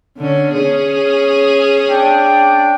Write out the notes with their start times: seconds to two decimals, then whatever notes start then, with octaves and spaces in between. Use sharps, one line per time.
0.17 D3 C#4
0.54 C#4 G#4
1.89 D4 G5